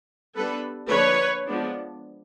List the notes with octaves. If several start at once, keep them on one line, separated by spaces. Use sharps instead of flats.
G3 B3 D4 A4 B4
D3 F3 A#3 D4 B4 C#5
F3 G#3 B3 D4